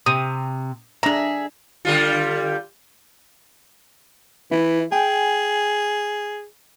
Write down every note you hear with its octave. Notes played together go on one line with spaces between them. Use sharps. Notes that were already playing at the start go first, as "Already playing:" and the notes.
C3 D#6
D4 G#4 E5 A#5
D3 G3 F4
E3 E4
G#4 G5 G#5